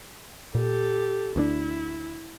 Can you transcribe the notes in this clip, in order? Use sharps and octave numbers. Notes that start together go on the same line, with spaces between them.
A#2 G4 A4
D2 A#3 D4 E4